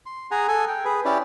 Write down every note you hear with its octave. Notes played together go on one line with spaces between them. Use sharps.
C6
G#4 F#5 G#5 A#5
A4 G#5
G5
G#4 B4
C#4 E4 G4 D5